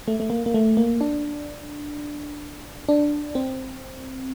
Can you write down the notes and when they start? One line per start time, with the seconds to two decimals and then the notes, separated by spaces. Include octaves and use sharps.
0.08 A3
0.20 A3
0.30 A#3
0.46 A#3
0.54 A3
0.77 A#3
1.01 D4
2.88 D4
3.35 C4